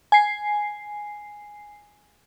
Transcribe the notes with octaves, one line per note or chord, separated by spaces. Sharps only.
G#5 C7